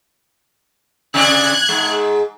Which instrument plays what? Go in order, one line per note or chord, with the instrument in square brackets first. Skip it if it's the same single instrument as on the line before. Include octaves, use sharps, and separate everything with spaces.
[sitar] C3 C4 D5 [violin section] F#6 G#6
[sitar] G#2 G#3